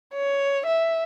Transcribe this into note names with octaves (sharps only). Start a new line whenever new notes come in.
C#5
E5